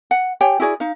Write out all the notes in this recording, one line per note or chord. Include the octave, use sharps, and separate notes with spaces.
F#5
G4 C#5 G5 G#5
E4 F#4 G#4 D5
D#4 F5